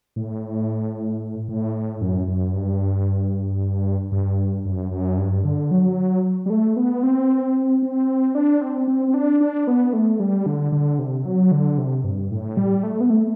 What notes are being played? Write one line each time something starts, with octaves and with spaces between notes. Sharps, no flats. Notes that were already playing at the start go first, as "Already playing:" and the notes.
A2
A2
F#2
F#2
G2
G2
F#2
F#2
G2
D3
F#3
G3
A3
B3
C4
C4
D4
C4
C4
C4
D4
D4
B3
A3
G3
D3
D3
C3
F#3
D3
C3
G2
A2
G3
A3
B3
A3